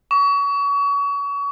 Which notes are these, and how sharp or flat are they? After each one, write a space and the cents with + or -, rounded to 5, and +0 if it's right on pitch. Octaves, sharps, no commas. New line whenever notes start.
C#6 +35